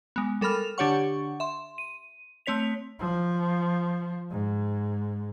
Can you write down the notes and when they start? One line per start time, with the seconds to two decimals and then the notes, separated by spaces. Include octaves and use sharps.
0.16 G#3 B3
0.41 G3 A4 A#4 B5 F6 F7
0.78 D3 D4 G4 C#5 F#5 C#6
1.40 E5 C6
1.78 D#7
2.46 A3 C4 C#5 B6 F7
3.00 F3
4.31 G#2